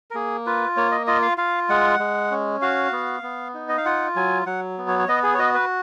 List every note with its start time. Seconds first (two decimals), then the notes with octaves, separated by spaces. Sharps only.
0.11 A#4
0.15 A#3 G#4
0.46 F4 B4
0.77 A#3 C#5
0.92 D#5
1.07 F4 D#5
1.22 F5
1.38 F4 F5
1.70 G#3 F#5
2.00 G#3
2.31 C#4
2.62 F#4 F5
2.92 B3
3.23 B3
3.54 D#4
3.69 D#5
3.78 F5
3.85 F4 F#5
4.16 F#3 G#5
4.46 F#3 F#5
4.78 B3
4.88 C#5
4.99 C#5
5.08 B3 D#5
5.23 G#4
5.35 C#5
5.39 F#4 D#5
5.54 B4